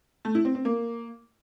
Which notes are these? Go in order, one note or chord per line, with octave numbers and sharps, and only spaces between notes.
A3
E4
C4
C4
A#3